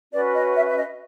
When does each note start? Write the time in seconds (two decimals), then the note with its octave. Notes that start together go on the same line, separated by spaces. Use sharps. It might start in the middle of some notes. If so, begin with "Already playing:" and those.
0.12 C#4 F#4 B4 D5
0.34 D#5
0.55 E5
0.69 E5
0.77 D#5